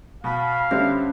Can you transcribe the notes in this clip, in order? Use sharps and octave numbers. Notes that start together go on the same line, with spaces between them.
B2 F5 B5
D3 G3 B3 C#4 C5 E5